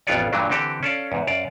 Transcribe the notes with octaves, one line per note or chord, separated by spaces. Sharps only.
A1 F2 B3 F4 C#5 D5
G2 A#2 E3 F#3 A3 D4
D3 E3 C4 G4 A4
C#4 A4 D5 F5
E2 G#2
F#2 D5 F5